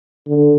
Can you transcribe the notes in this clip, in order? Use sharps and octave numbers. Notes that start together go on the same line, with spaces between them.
D3